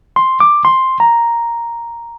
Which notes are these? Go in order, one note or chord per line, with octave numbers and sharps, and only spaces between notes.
C6
D6
C6
A#5